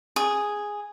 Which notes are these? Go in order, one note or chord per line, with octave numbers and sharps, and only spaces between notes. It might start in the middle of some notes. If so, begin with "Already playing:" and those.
G#4